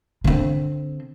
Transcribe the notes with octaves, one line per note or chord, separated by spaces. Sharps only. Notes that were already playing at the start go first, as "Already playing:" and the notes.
D3 C4